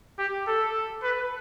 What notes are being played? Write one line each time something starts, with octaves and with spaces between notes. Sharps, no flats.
G4
A4
B4